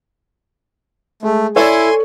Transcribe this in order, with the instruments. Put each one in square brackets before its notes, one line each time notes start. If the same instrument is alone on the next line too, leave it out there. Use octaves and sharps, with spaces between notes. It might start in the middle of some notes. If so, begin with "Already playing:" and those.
[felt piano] G#3 [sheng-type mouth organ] A3
[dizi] E4 [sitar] A4 [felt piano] C#5 D5 [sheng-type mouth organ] G#5 C6